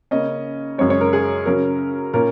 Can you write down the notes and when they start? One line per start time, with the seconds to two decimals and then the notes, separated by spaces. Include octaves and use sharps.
0.11 C#3 A#3 C#4 D#5
0.78 F#2 C#3 G#3 C#5
0.90 C#5
1.01 A#4
1.13 G#4
1.46 C#3 F#3 C#4 A#4
2.14 A#2 A#3 C#4 A#4